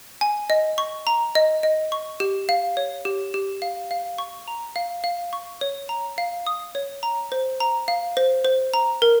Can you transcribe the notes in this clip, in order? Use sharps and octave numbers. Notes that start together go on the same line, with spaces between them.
G#5
D#5
C#6
A#5
D#5
D#5
C#6
G4
F5
C#5
G4
G4
F5
F5
C#6
A#5
F5
F5
C#6
C#5
A#5
F5
D#6
C#5
A#5
C5
A#5
F5
C5
C5
A#5
A#4